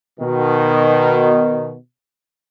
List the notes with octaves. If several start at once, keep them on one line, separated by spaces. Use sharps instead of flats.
B2 D#3